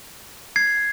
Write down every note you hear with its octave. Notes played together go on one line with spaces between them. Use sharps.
G#6 C7